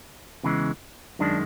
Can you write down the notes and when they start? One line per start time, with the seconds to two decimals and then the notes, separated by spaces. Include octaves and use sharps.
0.43 E2 C#3 E3 G#3
1.19 F#2 D#3 G#3 D4